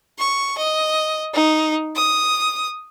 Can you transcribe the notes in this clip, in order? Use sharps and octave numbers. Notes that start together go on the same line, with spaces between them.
C#6
D#5
D#4
D#6